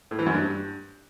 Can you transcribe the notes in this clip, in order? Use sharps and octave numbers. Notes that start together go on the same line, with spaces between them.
A2
E3
F#2
G2